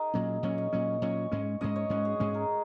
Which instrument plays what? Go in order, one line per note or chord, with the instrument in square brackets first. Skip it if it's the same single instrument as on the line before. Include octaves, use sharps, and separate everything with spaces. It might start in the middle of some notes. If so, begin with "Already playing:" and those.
Already playing: [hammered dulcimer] D#4 G#4 A#4
[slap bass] A#2 F#3 C#4
[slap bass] A#2 F#3 C#4 [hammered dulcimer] C#5
[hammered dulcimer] D#5
[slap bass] A#2 F#3 C#4
[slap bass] A#2 F#3 C#4 [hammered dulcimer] C#5
[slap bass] G#2 G#3 C#4
[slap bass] G#2 G#3 C#4 [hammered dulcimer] D#5
[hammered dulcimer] C#5
[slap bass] G#2 G#3 C#4 [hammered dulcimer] F#4
[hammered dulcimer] G#4
[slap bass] G#2 G#3 C#4 [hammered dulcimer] G#4
[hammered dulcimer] A#4